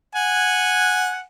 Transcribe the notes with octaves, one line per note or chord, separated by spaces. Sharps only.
F#5 G#5